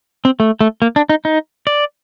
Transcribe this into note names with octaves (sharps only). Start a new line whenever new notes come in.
C4
A3
A3
A#3
D4
D#4
D#4
D5